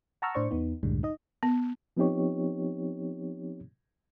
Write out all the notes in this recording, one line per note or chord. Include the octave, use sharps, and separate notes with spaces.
F#5 A5 A#5 C#6 E6 F6
A2 D4 C5 D5 C#6
E2 B3 D#4
C2 F#2 A2 D3 G3 G#3
D#4 D#5
B3
F3 B3 C4 D#4 G4 C#5